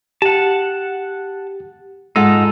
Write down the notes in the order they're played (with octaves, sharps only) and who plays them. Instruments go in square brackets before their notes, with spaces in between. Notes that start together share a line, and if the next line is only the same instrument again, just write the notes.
[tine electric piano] G4 [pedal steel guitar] F#5 A5
[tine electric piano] G#2 F#5 E6 [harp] G#3 F4 A4 [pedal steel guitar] D#4